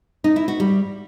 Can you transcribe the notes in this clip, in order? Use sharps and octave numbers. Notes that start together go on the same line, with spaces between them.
D#4
E4
F#4
G3